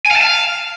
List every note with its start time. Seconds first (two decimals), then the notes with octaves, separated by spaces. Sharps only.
0.06 G#5
0.11 F5
0.16 A5
0.21 F5